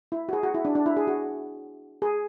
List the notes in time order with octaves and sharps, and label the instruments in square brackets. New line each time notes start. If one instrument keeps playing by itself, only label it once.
[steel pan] E4
F#4
G#4
F#4
E4
D4
D4
E4
G#4
F#4
G#4